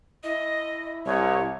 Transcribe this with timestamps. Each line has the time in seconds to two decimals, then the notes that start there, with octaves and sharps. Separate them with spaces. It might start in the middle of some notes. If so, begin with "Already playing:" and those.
0.23 E4 D#5
1.06 C2 C#5